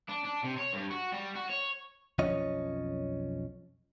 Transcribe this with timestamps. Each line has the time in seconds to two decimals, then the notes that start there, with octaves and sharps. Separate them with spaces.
0.09 D4
0.24 D4
0.43 C3
0.58 C#5
0.73 G2
0.91 F#4
1.13 G3
1.36 F#4
1.50 C#5
2.19 B1 F2 F3 C#4 C#5 D#5